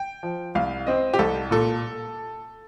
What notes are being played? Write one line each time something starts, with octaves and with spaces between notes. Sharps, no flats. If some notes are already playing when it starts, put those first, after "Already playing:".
Already playing: G5
F3
C2 F5
C4 D#5
G4
C2 A4
A#2 A4